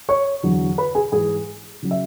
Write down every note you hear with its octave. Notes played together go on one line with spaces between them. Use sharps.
C#5 C#6
E2 D3 F#3
B4 B5
G#4 G#5
G#2 E3 G#4 G#5
C#3 F#3
E5